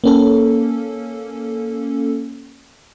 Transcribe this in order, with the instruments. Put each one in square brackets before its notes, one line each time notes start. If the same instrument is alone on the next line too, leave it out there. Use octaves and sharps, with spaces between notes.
[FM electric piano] A#3 C#4 A4